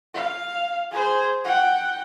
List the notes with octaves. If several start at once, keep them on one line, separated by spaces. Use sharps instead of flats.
F5
G#4 C5
F#5 G5